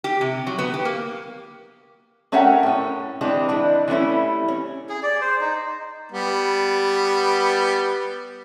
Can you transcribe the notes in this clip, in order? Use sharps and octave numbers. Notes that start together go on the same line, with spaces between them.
G4
C3
F#3
B3
G4
A#3
A3 C#4 A#4 E5 F#5 G5
A2 C#4
E3 G#3 C4 D4
E3 D4
E3 G3 A3 C#4 E4
C#4
G#4
D5
C5
D#4
G3 B3